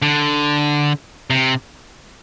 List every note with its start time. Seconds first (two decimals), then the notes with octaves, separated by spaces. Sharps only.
0.02 D3
1.30 C3